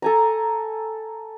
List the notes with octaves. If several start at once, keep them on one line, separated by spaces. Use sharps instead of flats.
A4 G#5 A#5